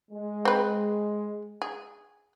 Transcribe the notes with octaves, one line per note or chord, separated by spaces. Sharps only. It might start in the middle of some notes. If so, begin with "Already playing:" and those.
G#3
C4 B4
G#4